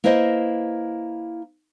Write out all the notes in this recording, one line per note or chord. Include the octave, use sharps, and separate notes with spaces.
A#3 E4 B4 C5 D#5